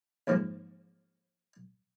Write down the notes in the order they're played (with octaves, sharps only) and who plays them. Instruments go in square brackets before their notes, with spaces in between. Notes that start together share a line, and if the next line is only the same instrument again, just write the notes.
[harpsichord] D#2 G#2 F3 A#3